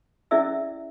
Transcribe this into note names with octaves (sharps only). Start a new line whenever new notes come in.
C#4 E4 G#4 D5 E5 E6